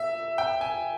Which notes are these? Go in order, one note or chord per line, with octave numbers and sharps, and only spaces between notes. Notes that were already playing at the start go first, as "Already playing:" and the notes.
Already playing: E5
G5
G#5